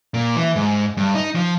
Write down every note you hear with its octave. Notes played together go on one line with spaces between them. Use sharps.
A#2
E3
G#2
G2
D#4
F3